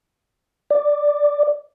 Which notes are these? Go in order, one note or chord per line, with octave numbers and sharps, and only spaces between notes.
D5